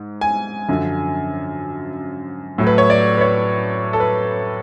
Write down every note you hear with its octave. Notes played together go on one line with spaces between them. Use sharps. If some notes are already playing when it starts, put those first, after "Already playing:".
Already playing: G#2
G#5
F#2 D3 F3
A2 F#3 A3
B4
C#5
D5
B4
C#5
A4
B4